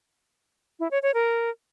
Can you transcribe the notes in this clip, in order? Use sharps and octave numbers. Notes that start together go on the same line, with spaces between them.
E4
C#5
C#5
A#4